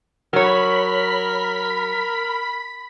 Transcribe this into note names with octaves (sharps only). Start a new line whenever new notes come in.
F#3 A#4 C#5 B5 B6